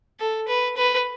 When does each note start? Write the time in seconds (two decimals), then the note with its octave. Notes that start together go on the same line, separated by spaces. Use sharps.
0.20 A4
0.48 B4
0.77 B4